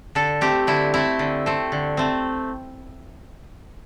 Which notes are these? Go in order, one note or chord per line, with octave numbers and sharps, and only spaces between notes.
D3 A4
A3 C4 G4
D3 E4
A3 C4 E4
D3
A3 C4
D3
A3 C4